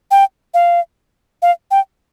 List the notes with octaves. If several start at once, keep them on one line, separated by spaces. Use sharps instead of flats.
G5
F5
F5
G5